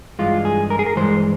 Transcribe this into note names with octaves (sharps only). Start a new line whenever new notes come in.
G2 E3 G#3 F4
G#4
A#4
G#4
A#4
G2 E3 G#3 C5